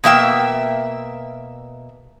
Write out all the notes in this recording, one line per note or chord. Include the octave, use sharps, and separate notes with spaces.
B2 A#3 E5 G5